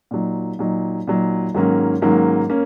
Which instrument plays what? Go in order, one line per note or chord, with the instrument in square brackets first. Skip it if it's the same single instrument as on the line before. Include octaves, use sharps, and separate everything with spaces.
[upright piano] A#2 F#3 D#4
A#2 F#3 D#4
A#2 F#3 D#4
G#2 D#3 F#3 A#3 C#4
G#2 D#3 F#3 A#3 C#4
A#3 C#4